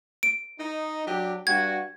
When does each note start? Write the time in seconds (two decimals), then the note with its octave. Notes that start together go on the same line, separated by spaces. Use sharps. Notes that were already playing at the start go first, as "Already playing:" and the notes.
0.23 D7
0.60 D#4
1.07 F#3 D4 G4
1.47 G2 G3 F#4 G#6